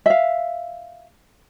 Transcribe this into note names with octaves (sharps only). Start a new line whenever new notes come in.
E5 F5